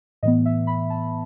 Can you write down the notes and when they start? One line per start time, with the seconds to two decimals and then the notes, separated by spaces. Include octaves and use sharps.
0.23 A2 E3 B3 D#5
0.45 E5
0.67 B5
0.90 A5